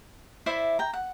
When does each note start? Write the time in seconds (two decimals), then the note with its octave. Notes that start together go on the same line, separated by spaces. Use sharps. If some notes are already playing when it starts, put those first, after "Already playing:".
0.46 E4 C5 D5 E5
0.79 G5 A#5
0.93 F#5